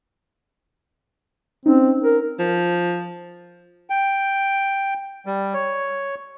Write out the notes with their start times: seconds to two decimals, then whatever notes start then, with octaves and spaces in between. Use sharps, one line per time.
1.66 C4 C#4 D#4
2.04 A#4
2.39 F3
3.90 G5
5.26 G3
5.54 C#5